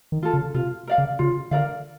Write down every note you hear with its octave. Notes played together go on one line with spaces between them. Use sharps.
D#3
F4 A4
C#3
C3 F4
A#4 D5 F5
C#3
C#3 F4
D3 A#4 D5 F5